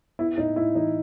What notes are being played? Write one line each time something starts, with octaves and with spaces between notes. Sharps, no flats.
B3 E4
A2 D#4
A2 E4
E3 D#4